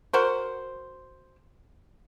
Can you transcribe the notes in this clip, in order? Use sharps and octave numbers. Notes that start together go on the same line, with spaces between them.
F#4 A#4 C5